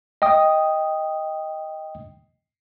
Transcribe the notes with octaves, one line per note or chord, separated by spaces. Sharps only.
D#5 G5 D#6